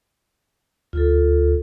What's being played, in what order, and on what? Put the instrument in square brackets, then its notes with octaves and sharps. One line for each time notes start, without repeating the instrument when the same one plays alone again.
[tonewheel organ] D2 [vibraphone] F4 A4